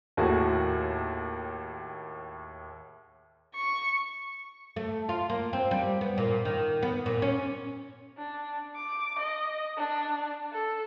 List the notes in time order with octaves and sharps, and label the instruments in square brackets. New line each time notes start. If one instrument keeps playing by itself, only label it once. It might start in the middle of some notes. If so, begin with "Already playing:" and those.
[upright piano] D#2 A2 F#4 G#4 A5
[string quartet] C#6
[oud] A3
F4
A#3
C4
G3
B3
A#2
D#3
B3
A#2
C#4
[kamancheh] D4
D6
D#5
D4
A4